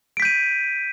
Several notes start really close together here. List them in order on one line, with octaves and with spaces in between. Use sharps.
D7 B6 G6 D#7